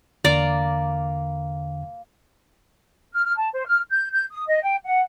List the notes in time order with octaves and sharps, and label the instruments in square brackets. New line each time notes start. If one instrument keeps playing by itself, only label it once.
[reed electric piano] E2 D3 [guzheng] A#3 A#5 [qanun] D5
[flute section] F6
F6
A5
C5
F6
G6
G6
D#6
D#5
G5
F#5